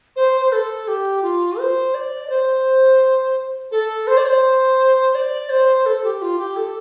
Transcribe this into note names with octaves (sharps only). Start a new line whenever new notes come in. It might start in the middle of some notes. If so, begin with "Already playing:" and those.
C5
C5
A4
G4
F4
C5
D5
D5
C5
A4
C5
D5
C5
D5
C5
A4
G4
F4
G4
A4